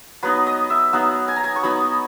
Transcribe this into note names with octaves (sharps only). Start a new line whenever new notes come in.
F#3 B3 D#4 B4
D#5
E5
F#3 B3 D#4 F#5
G#5
A#5
G#5
C#6
F#3 B3 D#4 B5